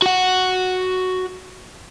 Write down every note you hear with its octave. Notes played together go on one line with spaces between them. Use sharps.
F#4 F#5